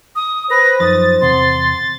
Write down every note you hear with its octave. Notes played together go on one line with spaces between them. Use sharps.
D#6
B4 C5 A#6
F#2 F3 D#4 D#6 A6
E2 C3 F#5 C6